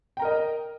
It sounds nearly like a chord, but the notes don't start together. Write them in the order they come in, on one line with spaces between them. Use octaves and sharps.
G5 A#5 A#4 D#5